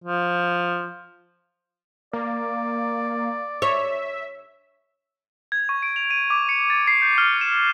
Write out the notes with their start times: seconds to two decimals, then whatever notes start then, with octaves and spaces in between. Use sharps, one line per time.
0.04 F3
2.13 A#3 D5
3.62 C#5 E5
5.52 G#6
5.69 C#6
5.83 D7
5.96 F7
6.11 D#7
6.30 D6
6.49 C#7
6.70 A6
6.87 C7
7.02 G6
7.18 F6
7.41 E7